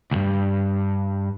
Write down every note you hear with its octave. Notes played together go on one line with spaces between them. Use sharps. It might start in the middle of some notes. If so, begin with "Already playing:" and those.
C#2 G2